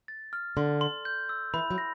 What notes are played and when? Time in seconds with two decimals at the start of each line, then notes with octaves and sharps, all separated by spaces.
0.08 A6
0.33 F6
0.57 D3 C6
0.81 C6
1.05 G6
1.29 E6
1.54 E3 B5
1.71 F#3
1.78 A#6